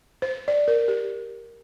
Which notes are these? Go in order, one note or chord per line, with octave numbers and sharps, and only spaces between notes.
C5
D5
A#4
G4